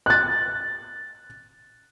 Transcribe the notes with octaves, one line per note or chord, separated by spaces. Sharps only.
F#6 A6